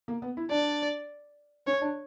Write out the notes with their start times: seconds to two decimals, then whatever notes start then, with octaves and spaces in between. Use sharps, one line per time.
0.08 A#3
0.22 B3
0.37 E4
0.51 D4 D5
1.67 C#4 C#5
1.81 D4